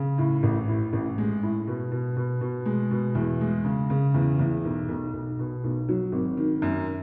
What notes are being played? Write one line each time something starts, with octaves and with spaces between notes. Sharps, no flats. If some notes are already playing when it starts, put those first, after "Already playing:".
Already playing: C#3
A2
A1
A2
A1
G#3
A2
B2
B2
B2
B2
G#3
B2
E2
G#3
C#3
C#3
E2
E2
B1
B1
B1
B2
B1
F#3
G#1
D#3
F#2